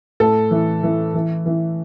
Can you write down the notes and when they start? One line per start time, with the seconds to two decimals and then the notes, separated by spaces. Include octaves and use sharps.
0.20 A2 A4
0.51 E3
0.83 E3
1.14 E3
1.46 E3